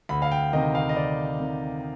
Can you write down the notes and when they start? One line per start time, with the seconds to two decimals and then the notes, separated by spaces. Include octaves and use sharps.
0.09 D2 B5
0.22 F5
0.32 G5
0.53 C3 D#3 D#5
0.75 F5
0.89 D#5
0.96 D2 D5
1.40 C3 D#3